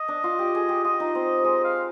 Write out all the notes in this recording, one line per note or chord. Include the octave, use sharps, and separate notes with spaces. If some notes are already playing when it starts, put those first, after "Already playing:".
Already playing: D#5
D4
F4
G4
G#4
G4
F4 D#5
D#4
C4
G#3 D#5
F5